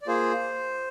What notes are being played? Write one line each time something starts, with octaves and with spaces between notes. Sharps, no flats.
D5
A#3 F4 G#4 C5